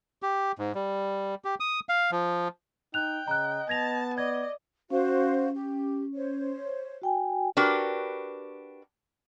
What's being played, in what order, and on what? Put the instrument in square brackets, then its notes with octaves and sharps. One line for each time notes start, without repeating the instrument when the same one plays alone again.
[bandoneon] G4
G#2
G3
G4
D#6
F5
F3
[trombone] D#4 [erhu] G5 [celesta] F#6 F7
[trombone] C#3 [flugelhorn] D#5 [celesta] A#5 F#6
[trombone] B3 [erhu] A5 [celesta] G#6 A#6 F7
[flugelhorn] D5 [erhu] D#5 [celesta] G#6
[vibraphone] C#4 [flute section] F#4 C5 F5
[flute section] G4
C5 C#5
[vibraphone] F#4 G5 G#5
[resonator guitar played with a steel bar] D4 F#4 G4 A#4 B4